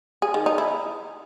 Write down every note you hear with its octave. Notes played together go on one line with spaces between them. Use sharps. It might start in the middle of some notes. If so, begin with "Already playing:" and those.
G#4
D#3
D#4
E4